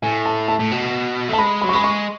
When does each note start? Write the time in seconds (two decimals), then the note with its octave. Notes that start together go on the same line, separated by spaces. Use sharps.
0.02 A2 G#5
0.26 A5
0.48 A5
0.59 A2
0.71 B2
1.28 A3
1.33 A5
1.38 G#3 B5
1.61 F#3 B5
1.69 C#6
1.73 G#3 B5
1.84 C#6